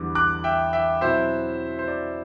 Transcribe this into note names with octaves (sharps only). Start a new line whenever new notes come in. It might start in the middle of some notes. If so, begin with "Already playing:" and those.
Already playing: E2 D3 G3 B3 E4 D6
D6 F#6
E5 G5
E5 G5
B2 F#3 C4 E4 C5 E5
C5
D5